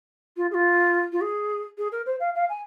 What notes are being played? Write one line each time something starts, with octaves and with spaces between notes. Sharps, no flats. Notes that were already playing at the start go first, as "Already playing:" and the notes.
F4
G#4
F4
F4
G#4
G#4
A#4
C5
F5
F5
G#5